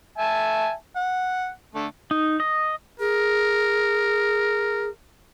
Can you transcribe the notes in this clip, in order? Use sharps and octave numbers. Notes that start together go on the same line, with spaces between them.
E5 G#5 A5
F#5
D3 A3
D#4
D#5
G#4 A#4